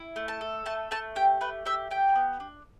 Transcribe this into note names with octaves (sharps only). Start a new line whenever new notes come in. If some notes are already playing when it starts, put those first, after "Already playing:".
Already playing: E4
A3
A5
A4
A3 A5
A3 A5
G4 G5
A3 B4
G4 E5
G4 G5
B3
D4